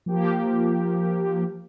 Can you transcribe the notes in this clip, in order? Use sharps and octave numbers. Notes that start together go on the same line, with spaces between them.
F3 A#3 G4